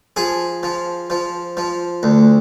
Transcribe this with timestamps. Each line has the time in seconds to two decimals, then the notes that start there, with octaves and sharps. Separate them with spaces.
0.16 F3 G#4
0.63 F3
1.10 F3
1.57 F3
2.03 D2